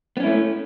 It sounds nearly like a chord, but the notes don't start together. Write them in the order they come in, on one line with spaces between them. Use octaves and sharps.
B3 C#4 E4 A3